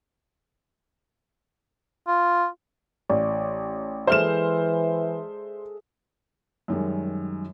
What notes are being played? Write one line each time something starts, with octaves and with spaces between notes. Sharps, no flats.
F4
A1 D5
E3 G#3 A4 C5 E5 F6 E7
F#2 D#3 G3 G#3